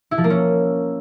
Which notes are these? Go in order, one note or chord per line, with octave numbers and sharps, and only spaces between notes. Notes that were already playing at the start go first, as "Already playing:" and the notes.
E4
F3
A#3
C#4